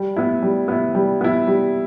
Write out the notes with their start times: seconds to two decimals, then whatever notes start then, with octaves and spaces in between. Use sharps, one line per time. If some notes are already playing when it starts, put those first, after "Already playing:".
Already playing: G3
0.16 B3 E4
0.43 G3
0.68 B3 E4
0.95 G3
1.21 B3 E4
1.47 G3